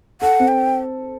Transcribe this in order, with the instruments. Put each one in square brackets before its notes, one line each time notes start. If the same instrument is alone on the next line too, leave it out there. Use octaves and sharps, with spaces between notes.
[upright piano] A4 [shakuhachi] F#5
[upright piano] C4
[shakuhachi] G5